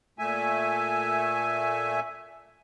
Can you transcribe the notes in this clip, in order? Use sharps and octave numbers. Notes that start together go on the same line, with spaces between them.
A#2 A3 E5 G#5